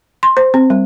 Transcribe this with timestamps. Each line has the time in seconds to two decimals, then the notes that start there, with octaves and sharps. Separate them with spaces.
0.23 C6
0.37 C5
0.54 C4
0.70 G3